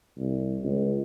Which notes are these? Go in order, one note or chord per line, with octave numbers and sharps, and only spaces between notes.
C2
C#2